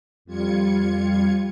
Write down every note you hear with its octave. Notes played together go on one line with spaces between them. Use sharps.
F2 G3 F4 G#6 C#7